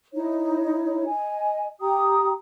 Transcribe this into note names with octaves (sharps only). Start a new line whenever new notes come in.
D#4 E4 C#5
D#5 G#5
G4 G5 A#5 D#6